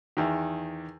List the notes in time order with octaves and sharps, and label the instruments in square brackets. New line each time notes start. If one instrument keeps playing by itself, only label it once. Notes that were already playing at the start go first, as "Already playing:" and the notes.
[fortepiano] E2 D#3